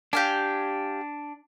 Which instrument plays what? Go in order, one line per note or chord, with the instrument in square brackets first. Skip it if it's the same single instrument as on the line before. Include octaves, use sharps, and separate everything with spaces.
[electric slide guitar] D4 [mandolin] G4 F5 G#5